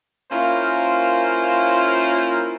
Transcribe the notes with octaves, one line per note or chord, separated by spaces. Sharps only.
A#3 C#4 E4 F4 A#4 C5